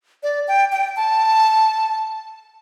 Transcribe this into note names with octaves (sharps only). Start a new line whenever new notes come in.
D5
G5
G5
A5